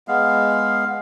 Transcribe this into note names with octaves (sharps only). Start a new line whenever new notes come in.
G#3 B3 F5